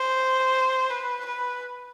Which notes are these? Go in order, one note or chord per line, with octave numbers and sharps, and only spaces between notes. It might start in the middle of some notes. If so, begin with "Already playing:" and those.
Already playing: C5
B4
B4